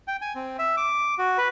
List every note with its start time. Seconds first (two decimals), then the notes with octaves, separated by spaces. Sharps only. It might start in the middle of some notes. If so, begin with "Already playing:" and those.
0.08 G5
0.21 G#5
0.35 C4
0.59 E5
0.77 D6
1.18 F#4
1.38 B4